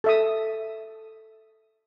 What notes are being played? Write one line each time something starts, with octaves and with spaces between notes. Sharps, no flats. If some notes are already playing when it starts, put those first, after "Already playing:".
A4 E5 D#6